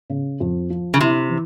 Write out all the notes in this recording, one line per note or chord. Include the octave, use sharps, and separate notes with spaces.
C#3
F2
F3
C#3
C3 E4
E3